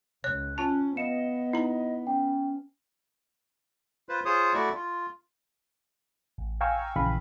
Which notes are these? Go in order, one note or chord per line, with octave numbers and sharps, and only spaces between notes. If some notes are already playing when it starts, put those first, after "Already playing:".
C#2 C#5 F#6
C#4 F4 A5
B3 D#5 F5 C#7 E7
D#4 E4 A#5
C#4 G5
F4 B4 C5
F4 G#4 C5 C#5 D#6
A3 E4 F#4 D5 C#6
F4
A1
F5 G5 G#5 A#5 C#6 E6
A#1 C#3 E3 F5 B5